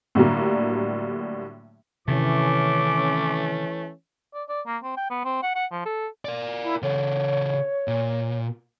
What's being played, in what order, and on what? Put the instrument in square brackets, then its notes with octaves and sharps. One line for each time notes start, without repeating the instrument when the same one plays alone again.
[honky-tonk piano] A2 D3 F#3 G3 A#3
[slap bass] C3 D#3 [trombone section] E3 C#4 [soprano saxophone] A3 [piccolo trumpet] D6
[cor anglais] D5
D5
A#3
C4
G5
B3
C4
F#5
F#5
F3
A4
[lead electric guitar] A#4 D5
[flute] E4
[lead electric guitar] C#3 A4 [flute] C#5
[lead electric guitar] A#2